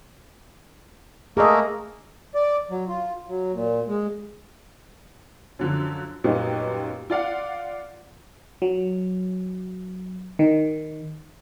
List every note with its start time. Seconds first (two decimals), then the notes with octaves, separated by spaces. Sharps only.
1.37 A3 A#3 G#4 A#4 D#5
2.35 D5
2.70 F#3
2.88 F4
3.28 F#3
3.53 A#2
3.88 G#3
5.59 F#2 D3 F3
6.24 F#2 A#2 G3 B3 C#4 D#4
7.10 F4 D5 F5 F#5
8.62 F#3
10.39 D#3